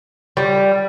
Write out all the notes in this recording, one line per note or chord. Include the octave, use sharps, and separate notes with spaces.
G3